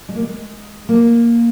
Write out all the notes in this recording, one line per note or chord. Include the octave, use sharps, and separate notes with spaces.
G#3
A#3
G#3
A#3